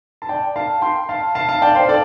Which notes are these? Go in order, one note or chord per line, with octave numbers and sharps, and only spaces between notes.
A5
D5 G5
F5 A5
G5 C6
F5 A5
F5 A5
F5 A5
D5 G5
C5 F5
A4 D5